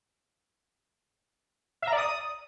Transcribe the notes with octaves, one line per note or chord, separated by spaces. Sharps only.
E5
A#5
D5
D#6